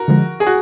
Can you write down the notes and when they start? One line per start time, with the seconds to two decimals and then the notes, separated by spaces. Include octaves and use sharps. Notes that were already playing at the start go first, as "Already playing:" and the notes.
Already playing: F#4 A#4
0.08 D3 F3 G#3
0.40 G#4
0.47 F#4